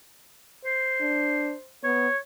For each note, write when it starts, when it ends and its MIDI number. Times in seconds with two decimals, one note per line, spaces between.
0.65 1.72 72
1.01 1.53 62
1.84 2.08 59
1.84 2.17 73